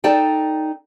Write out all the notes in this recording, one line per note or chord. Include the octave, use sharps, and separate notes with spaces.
D#4 A4 D5 G5 A5